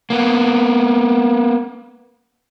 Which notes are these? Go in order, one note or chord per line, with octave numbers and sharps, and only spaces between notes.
A#3 B3